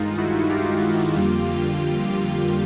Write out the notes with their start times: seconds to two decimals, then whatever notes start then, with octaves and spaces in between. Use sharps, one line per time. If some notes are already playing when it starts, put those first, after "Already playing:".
Already playing: G2 D#3 G#3 D#4 F4
0.18 E4 F#4
0.50 F4 G4
1.15 F2 D3 G3 A#3